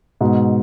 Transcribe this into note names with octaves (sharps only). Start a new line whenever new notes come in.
G#2 B2